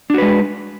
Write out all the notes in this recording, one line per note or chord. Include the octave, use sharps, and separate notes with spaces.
G#3 D4 F#4 B4